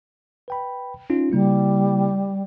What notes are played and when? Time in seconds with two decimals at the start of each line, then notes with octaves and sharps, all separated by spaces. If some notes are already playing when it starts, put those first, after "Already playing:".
0.48 B4 G5 B5
1.10 C#4 D#4 F4
1.32 C#3 G3 A#3 E4